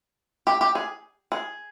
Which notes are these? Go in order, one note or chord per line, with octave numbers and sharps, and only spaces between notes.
G4
G4
G#4
G#4